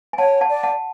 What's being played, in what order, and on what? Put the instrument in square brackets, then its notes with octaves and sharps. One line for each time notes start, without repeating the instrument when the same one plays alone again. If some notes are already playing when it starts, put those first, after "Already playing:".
[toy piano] G#5
[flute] C#5 [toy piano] F#5 A5
[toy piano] F#5 A5
[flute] D5
[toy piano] F#5 A5